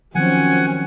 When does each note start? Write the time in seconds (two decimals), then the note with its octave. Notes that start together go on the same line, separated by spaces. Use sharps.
0.15 D#3 F3 F#3 C4 C#4 F#5 G#5